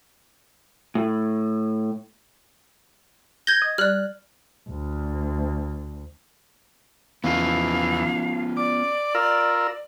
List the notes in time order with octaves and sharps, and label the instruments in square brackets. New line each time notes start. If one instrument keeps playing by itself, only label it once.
[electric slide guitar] A2
[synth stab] G6 [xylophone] G#6 A#6
[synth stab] D#5
[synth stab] G3 F#6 [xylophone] D5 F6
[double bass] D2
[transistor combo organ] E2 [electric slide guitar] B3 C#4 F4 [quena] F5
[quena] D5 [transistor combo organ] D6
[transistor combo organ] F4 A#4 E6